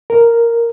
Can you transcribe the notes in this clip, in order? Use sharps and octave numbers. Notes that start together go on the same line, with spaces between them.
A#4